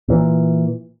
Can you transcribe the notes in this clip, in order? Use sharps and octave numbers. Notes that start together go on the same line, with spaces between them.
A#2 E3